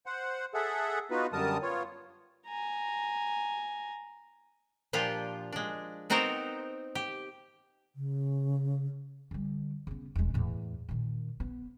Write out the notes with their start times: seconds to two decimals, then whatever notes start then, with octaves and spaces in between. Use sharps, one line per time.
0.06 C5 F#5
0.54 G#4 A4 E5 F#5
1.11 B3 D#4 F4 F#4 B4
1.33 F#2 D3 G3 A#4 A5 D#6
1.62 B3 F4 C#5
2.47 G#5 A#5
4.93 A#2 F3 D4 F4 G4
5.52 G#3 D4
6.10 B3 C4 D#4 F#4 A#4 C5
6.95 G4
7.96 C#3
9.31 D3 G3
9.87 C#3 B3
10.16 E1 G#3
10.34 E2 A2
10.89 A#2 D#3
11.40 B3